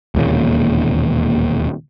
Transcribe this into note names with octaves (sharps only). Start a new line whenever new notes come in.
E1 D#2 A#2 C#3